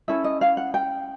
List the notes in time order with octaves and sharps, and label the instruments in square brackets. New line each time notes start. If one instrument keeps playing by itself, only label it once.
[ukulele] C#4 E4 A4 E5
D#5
F5
F#5
G5